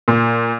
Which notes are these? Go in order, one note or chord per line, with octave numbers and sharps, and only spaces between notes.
A#2